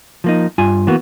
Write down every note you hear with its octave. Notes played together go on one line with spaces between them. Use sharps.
F3 A#3 D#4
G2 F4 G#5
E3 A#3 B3 F#4